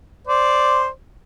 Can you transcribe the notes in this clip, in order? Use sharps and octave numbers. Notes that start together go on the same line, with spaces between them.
C5 D5